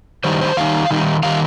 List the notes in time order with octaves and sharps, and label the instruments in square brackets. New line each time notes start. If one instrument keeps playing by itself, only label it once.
[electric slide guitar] D#3 G3 D#4 C5
C5
D#3 G3 D#4 F5
D#3 G3 D#4
D#3 G3 D#4 F5